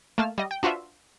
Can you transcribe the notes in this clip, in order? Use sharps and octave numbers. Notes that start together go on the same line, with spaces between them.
A3 A#3 A5 F6
G3 D#5
G5
D4 F4 F#4 B4 C5 E5